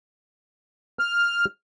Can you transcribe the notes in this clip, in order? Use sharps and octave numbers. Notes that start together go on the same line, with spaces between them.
F6